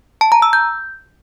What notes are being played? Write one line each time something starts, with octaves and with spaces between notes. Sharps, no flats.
A5
A#5
E6
G6